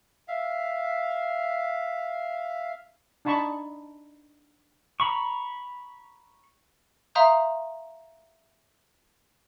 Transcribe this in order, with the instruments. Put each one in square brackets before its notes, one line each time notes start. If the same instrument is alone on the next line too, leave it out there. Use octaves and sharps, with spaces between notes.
[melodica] E5 F5
[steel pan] D4 D#4 A5 B5 C#6
[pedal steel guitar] A#5 B5 C#6
[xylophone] E5 F5 A#5 C6 D#6 G6